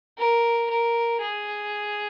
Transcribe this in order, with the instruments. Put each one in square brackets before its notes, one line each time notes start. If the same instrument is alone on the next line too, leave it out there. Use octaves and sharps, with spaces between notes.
[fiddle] A#4
A#4
G#4